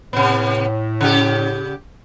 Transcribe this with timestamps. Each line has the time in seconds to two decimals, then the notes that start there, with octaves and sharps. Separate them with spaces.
0.13 A2 C3 B3
1.01 C#3 G4